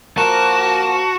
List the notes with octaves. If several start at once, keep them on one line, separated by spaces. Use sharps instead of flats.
F3 A#3 F#4 A5 E7